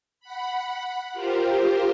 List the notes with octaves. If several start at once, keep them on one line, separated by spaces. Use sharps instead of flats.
F#5 B5
F4 G4 A#4 C5